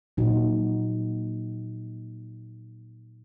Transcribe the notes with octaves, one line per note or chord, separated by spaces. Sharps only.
A#2 F#3 D#4 F#4